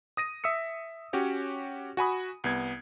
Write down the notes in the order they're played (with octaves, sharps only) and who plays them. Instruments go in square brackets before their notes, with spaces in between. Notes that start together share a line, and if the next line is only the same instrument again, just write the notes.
[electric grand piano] D#6 A#6 D#7
E5 D#6 E6 C#7
C#4 F#4 G4 C#5
F#4 G#5 B5 D#6
C2 B3 G#6